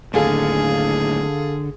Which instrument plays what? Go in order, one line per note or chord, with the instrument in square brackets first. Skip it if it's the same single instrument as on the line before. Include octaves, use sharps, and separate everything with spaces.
[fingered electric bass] D#2 A2 [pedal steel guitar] D3 [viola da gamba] G#4 [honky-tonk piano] A4 F5 G#5